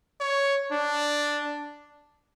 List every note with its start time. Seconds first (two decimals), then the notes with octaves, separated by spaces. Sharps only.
0.20 C#5
0.71 D4